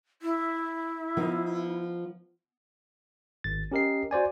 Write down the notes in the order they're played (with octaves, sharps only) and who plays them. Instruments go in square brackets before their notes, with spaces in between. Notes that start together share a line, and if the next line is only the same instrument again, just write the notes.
[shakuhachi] E4
[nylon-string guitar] F3 B3 D#4
[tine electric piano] G#1 A6
C#4 G4 A#4 D#5 C7
F#4 C5 D5 G#5